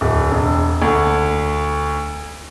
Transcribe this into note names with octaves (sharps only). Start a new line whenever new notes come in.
D1
E1
D2